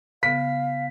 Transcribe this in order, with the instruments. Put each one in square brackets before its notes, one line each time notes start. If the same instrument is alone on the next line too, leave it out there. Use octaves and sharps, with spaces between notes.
[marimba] C#3 B3 [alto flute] F5 [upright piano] B6